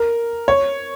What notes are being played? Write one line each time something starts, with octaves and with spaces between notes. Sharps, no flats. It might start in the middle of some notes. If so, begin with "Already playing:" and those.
Already playing: A#4
C#5